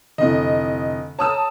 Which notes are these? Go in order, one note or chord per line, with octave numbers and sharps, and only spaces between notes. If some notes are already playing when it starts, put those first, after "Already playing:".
F1 D3 C4 E4 D#5
C#5 A5 A#5 D#6 E6